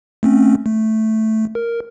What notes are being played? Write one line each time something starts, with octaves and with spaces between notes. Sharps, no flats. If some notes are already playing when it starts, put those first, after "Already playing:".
A3 C4 C#4
A3
A#4